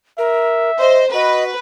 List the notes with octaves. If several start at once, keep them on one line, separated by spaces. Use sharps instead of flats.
A#4 E5
C5 D#5
F#4 B4 D#5